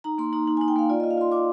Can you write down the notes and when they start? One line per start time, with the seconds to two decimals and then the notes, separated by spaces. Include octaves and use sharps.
0.04 D#4 A#5
0.18 A#3 C6
0.33 D#4 A#5
0.48 D#4
0.57 G#5
0.61 D#4
0.68 G5
0.76 A#3 F5
0.90 F4 D5
1.00 D#5
1.04 F4
1.11 F5
1.18 F4 C6
1.32 F4 D6